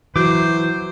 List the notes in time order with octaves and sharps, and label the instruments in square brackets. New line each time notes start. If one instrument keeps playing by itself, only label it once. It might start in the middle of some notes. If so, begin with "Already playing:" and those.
[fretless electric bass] E3 [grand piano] F#3 [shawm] C5 [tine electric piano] D6 G6